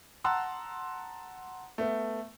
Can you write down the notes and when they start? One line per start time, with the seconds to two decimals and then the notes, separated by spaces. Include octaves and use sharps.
0.24 F#5 A5 A#5 C6 E6 F#6
1.78 A3 B3